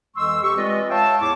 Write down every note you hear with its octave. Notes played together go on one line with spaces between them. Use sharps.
F2 E3 G#3 C6 C#6 E6
G4 C#6
G#3 C4 F4 B4 D5 D#5
C#5 E5 F5 G5 A5
E2 A2 E4 C#5 D6